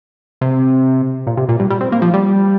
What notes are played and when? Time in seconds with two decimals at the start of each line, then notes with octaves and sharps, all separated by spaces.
0.41 C3
1.27 A#2
1.37 C3
1.49 A#2
1.60 G2
1.70 G3
1.81 C4
1.92 A#3
2.02 F3
2.13 G3